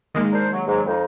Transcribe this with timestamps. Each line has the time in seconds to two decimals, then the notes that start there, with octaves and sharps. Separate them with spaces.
0.14 D#3 G#3 A#3
0.32 D4 A#4 C5
0.51 F#3
0.67 G#2 F#3
0.86 F2 D#4